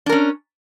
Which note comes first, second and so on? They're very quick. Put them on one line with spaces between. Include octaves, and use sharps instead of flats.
D4 A#4 C#4